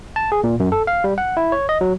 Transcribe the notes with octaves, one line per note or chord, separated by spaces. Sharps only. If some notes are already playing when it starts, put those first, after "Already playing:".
A5
G#4
A#2
F#2
A4
F5
G3
F#5
E4
C#5
D#5
F#3